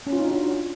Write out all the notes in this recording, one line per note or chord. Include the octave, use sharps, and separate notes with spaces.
C#4
F4
D#4
D4
F#4